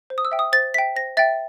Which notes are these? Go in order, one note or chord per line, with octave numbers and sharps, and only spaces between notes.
C5
D#6
E6
E5 G5
D#6
C5 A6
E5 G5 B6
C5 A#6
E5 G5 A6